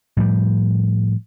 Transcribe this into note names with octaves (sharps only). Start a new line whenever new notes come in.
A2 F3 G3